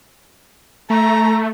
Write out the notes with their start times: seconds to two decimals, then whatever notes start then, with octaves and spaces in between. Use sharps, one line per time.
0.90 A3 A#5